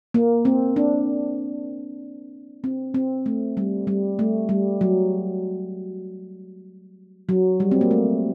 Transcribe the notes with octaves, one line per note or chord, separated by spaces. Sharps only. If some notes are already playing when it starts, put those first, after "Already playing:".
A#3
C4
D4
C4
C4
A3
G3
G3
A3
G3
F#3
F#3
G3
C4
A#3
A3